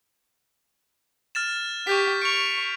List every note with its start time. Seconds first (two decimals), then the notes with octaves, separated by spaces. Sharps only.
1.35 F6 A6 E7
1.87 G4 C#6 G6 B6
2.22 C#6 D7 F7